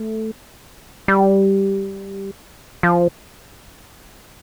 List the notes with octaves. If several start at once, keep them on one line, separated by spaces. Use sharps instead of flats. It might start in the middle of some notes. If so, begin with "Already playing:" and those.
Already playing: A3
G3
F3